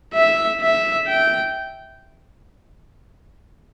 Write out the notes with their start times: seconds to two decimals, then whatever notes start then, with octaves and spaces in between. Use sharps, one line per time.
0.14 E5
0.62 E5
1.07 G5